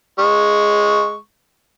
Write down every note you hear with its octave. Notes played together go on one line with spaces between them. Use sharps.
G#3 C#6